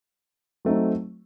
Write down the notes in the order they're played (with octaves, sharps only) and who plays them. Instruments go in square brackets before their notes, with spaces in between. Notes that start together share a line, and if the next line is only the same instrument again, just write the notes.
[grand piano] F#3 A3 C4 D#4